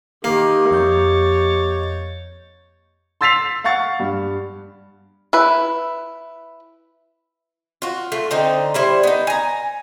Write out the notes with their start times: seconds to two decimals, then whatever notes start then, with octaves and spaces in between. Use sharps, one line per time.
0.24 D#3 A#3 G4
0.71 F2 C#5 D#5 G6 A6
3.21 C6 E6 A6 B6 C7 F7
3.64 F5 F#5 C#6 A6
4.00 G2
5.33 E4 B4
7.82 F4 F#4
8.12 A3 F4
8.31 D3 C4 D#4
8.74 G3 E4 C5
9.03 B3 D#4
9.27 G#5 A#5